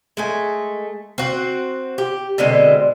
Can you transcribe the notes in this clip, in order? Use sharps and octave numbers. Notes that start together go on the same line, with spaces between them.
G#3 A3 G#5
C4 F#4
G4
B2 D3 G#3 C4